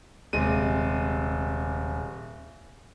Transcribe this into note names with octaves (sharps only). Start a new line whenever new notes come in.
D#1 C3 G#3 D#7